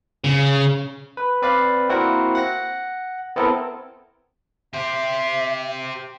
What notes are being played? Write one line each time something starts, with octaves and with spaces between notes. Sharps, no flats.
C#3
B4
C4 B4 D5 F5
A#3 C4 E4 F#4 A#4 F#5
F#5 A#6
B3 C4 E4 A4 A#4
G4 C5 E5